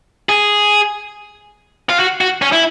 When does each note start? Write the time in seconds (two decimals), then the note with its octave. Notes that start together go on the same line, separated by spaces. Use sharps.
0.29 G#4
1.89 F4
1.99 F#4
2.21 F#4
2.42 C#4
2.52 E4